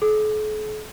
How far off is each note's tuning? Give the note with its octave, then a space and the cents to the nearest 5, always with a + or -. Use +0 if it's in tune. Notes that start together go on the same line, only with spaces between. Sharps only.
A4 -45